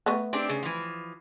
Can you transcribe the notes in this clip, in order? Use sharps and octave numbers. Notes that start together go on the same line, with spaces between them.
A3 B3
C4 D4 G4
C#3
E3 F3